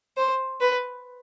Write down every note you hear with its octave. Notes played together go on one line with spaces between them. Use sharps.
C5
B4